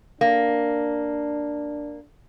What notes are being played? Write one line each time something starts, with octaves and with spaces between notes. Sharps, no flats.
A#3 D4